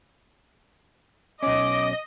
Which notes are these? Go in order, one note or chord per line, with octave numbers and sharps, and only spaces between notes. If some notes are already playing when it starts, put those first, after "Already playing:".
B1 C#4 D#5 D6